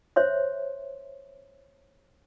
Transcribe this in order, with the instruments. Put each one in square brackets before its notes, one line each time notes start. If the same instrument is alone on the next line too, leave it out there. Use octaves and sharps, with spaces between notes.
[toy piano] C5 C#5 E5 C6